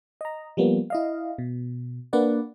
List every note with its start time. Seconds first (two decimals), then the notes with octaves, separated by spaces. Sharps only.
0.21 D#5 A#5
0.57 F3 G3 A#3 B3
0.90 E4 D#5 F5
1.38 B2
2.13 A#3 D4 B4 D5 F#5